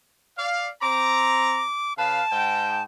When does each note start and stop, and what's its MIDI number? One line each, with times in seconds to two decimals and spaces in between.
0.37 0.69 74
0.37 0.69 77
0.81 1.65 60
0.81 1.65 82
0.81 1.93 86
1.98 2.22 49
1.98 2.22 71
1.98 2.22 77
1.98 2.82 81
2.31 2.83 44
2.31 2.83 79